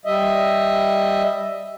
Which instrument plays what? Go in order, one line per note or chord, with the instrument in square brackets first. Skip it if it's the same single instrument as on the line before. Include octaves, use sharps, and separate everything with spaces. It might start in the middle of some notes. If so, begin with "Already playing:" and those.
[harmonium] G3 D#5 E5